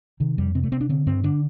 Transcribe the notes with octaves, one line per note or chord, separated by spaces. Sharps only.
C3 D#3
F2 G3
C3 C4
A3
C3 C4
D4
D3 C4
G2 C4
D3 D4